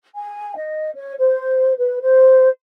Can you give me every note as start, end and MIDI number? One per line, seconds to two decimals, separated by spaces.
0.15 0.55 80
0.57 0.90 75
0.94 1.14 73
1.18 1.73 72
1.77 2.00 71
2.00 2.49 72